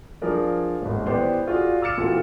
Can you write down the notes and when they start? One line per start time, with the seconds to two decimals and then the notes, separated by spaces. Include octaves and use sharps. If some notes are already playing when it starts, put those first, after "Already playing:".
0.22 F3 D4 G#4 A#4 D5
0.82 D#1 G#1
1.06 E3 B3 G4 C5 D5
1.48 F4 F#4 G#4 D5
1.81 D6 E6 F6 A6 C#7 E7
1.98 A#2 E3 C4 F4 F#4 A4